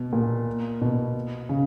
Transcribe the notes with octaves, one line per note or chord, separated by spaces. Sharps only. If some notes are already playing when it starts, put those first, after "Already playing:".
Already playing: B2
A#2
B2
C#3